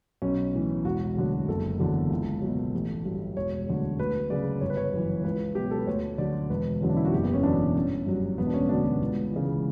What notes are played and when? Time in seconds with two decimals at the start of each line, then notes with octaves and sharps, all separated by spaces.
0.22 B1 C#4
0.54 A2 E3
0.85 E1 F#4
1.16 D2 D3 F#3
1.48 F#1 A4
1.79 E2 D3 F#3
2.10 C#2
2.42 B2 F#3
2.74 A1
3.05 G2 F#3
3.36 E1 C#5
3.67 D2 D3 F#3
3.99 D2 B4
4.30 C#3 F#3 D5
4.61 G1 C#5
4.70 B4
4.77 C#5
4.93 F#2 E3
5.24 C#2 B4
5.55 B2 F#3 G4
5.71 A4
5.78 B4
5.87 D2 C#5
6.18 D3 F#3 D5
6.50 E1 B4
6.81 E2 D3 F#3 C#4
6.90 D4
6.97 E4
7.05 F#4
7.12 F#1 G4
7.24 B3
7.33 C#4
7.43 E2 B2 D4
7.75 G1 C#4
8.06 G2 F#3
8.37 E1 B3
8.47 D4
8.54 C#4
8.69 D2 D3 F#3 D4
8.84 B3
9.01 C#2
9.32 C#3 E3